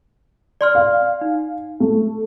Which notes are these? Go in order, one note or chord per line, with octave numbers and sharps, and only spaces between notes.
D5 C6 F6
F5
D#4
A3